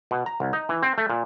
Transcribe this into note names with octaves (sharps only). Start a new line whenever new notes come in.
B2
A#5
C2
D#4
E3
C4
A3
A#2